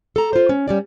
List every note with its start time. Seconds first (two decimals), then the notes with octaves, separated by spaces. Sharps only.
0.16 A4 A#5
0.33 F4 C5
0.49 C#4
0.68 G3 C#4 D5